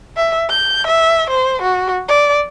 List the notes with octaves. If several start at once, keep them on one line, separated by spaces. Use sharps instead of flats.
E5
G6
E5
C5
F#4
D5